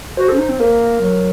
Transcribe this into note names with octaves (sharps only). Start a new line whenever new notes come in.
F#4 C5
A4
C#4
D#4
C4
A#3 A#4
F#3